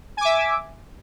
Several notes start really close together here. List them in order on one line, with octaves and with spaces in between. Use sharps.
G#5 D6 E5